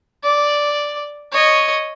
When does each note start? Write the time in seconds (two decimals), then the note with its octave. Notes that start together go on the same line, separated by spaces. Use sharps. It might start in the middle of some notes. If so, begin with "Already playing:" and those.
0.23 D5
1.32 C#5 D#5